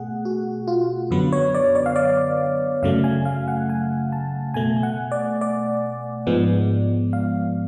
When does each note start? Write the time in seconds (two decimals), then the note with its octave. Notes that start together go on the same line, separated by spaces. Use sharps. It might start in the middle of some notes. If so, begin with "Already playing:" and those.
Already playing: B2 A3 G#4 F#5
0.25 F#4
0.68 F4
1.11 F#2 D3 F#3 B3 B4
1.32 C#5
1.54 D5
1.75 D5
1.86 F5
1.96 D5
2.83 F#2 C#3 F#3 A3 F5
3.04 G#5
3.25 F5
3.48 F#5
3.69 G#5
4.12 A5
4.54 B2 A3 G#5
4.83 F#5
5.12 D5
5.41 D5
6.27 G#2 F3 G#3 B3
7.13 F5